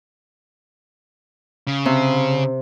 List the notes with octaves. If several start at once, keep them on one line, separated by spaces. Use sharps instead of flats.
C#3
C3